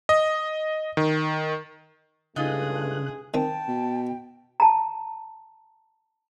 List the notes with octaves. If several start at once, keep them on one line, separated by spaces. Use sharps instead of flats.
D#5
D#3
C#2 G2 C#3 A3 D#4 F4 G#4 F#6
D#3 C4 G5 A5
B2
A5 A#5